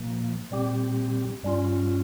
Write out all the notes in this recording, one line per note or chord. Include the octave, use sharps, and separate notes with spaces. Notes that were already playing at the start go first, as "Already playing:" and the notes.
Already playing: A#2 F3 A#3
A#2 G3 C4 G4
G2 G3 C#4 F4